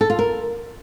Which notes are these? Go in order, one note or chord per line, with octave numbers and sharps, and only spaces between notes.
A4
F4
A#4